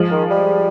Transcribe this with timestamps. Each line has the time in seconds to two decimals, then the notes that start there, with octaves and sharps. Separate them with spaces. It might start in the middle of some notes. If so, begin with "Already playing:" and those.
Already playing: F3 G#3
0.11 D#3
0.30 G3